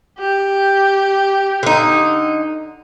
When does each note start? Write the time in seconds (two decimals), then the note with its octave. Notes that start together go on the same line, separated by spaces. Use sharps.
0.19 G4
1.63 D3 D#4